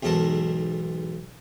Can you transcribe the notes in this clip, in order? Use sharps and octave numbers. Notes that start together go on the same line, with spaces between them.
B1 E2 G#2 A4 A#4 A5